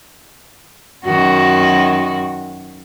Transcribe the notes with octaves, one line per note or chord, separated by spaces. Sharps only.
F#2 D#3 F#4